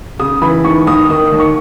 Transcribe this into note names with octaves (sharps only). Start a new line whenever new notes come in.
C#3 D#6
E3 B5
D#2 C#6
D#2 D#6
D#3 D#6
D#2
C#6